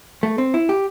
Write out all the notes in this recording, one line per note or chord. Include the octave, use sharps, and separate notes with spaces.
A3
C4
E4
G4